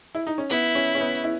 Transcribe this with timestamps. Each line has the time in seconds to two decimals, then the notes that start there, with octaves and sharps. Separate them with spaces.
0.15 E4
0.27 D#4
0.38 C#4
0.50 B3 E4
0.75 C#4
0.95 C#4
1.00 B3
1.24 E4